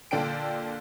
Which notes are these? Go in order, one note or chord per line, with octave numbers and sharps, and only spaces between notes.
A#2 D3 D4 A4 G5 D7